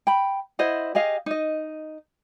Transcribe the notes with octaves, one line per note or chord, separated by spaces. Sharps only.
G5 B5
E4 C5 D#5 F#5
G4 G#4 D#5 F5
D#4 D#5